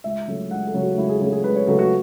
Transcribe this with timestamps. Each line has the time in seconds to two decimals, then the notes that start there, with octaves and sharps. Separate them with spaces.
0.04 C#2 E5
0.27 C#3 F#3 A3
0.51 C#2 F#5
0.67 A4
0.74 C#3 F#3 A3
0.83 F#4
0.97 C#2 E4
1.09 G#4
1.21 C#3 F#3 A3 G#4
1.32 G#4
1.44 C#2 B4
1.56 C#5
1.67 C#3 F#3 A3 F#4
1.79 F#4